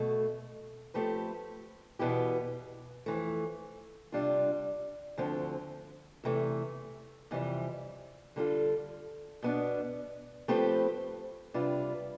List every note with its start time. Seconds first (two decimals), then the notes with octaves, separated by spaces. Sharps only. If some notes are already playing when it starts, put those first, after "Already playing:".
Already playing: B2 A3
0.94 F3 A3 C4 G4 B4
1.99 E2 B2 B3 E4 G4
3.06 F2 E3 A3
4.12 C3 G3 D4 F4
5.17 D2 D3 F3 C4
6.24 E2 C3 E3 A3
7.31 F2 C3 E3 G3
8.36 D3 G3 B3 F4 A4
9.42 B2 B3 D4
10.48 F3 A3 C4 G4 B4
11.54 C3 G3 D4 F4 B4